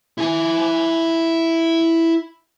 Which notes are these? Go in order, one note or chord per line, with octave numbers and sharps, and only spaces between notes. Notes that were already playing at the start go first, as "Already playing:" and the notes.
E4 G#5